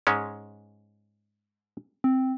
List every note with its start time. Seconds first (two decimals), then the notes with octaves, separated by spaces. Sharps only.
0.07 G#2 G#3 C#4
2.04 C4